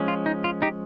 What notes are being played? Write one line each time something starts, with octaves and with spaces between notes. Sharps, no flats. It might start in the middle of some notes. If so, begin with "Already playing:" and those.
Already playing: F3 G#3 C#4
F4
D#4
F4
D#4 G4